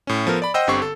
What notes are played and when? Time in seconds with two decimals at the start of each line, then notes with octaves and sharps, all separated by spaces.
0.07 A2 C#4
0.27 F3 B3 A4 A#4
0.42 D5 B5
0.54 C5 D#5 F#5 G5 E6
0.67 G1 D3 C4 G4 C#6 C7
0.82 A4